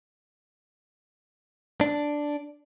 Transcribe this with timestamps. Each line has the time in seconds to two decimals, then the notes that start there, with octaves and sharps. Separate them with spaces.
1.81 D4